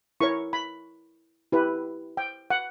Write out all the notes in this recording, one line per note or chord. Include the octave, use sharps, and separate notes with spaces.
E4 A#4 C#5 C#6
B5
E4 G4 B4
G5
F#5